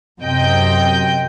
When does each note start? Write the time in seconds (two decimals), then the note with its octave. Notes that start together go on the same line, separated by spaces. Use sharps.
0.20 F#2 C3 D#5 G5 G6